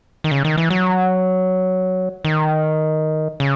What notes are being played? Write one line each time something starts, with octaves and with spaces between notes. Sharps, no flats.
D#3
C#3
D#3
E3
F#3
D#3
C#3